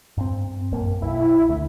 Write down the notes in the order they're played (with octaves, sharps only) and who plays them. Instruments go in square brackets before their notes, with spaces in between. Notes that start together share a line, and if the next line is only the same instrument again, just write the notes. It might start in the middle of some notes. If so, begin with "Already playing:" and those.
[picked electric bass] G2 C4
A#1 F#2 A#3
[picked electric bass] B1 [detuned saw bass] E4
[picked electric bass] D2